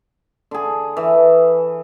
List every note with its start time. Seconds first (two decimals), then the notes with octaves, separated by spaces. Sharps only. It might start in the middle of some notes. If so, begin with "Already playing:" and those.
0.51 D3 G#4
0.97 E3